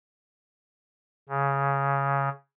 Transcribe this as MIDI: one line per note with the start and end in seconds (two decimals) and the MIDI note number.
1.29 2.29 49